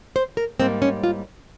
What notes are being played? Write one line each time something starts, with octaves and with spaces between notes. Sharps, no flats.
C5
A#4
G#2 G3 A#3 C4
C#4
F4